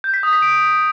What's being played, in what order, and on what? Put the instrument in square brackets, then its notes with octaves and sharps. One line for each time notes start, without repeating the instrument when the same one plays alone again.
[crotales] G6
B6
D#6
B6
D7